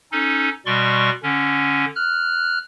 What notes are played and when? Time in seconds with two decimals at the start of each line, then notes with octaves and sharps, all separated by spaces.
0.12 C#4 D#4 A4
0.66 B2 G3 D5 C6 C#6
1.23 D3 C#4
1.95 F6 F#6